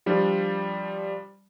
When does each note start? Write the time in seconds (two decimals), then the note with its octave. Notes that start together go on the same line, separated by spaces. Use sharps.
0.06 F3 G3 D4